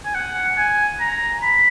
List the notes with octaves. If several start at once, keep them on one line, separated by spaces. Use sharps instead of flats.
G#5
F#5
G#5
A#5
B5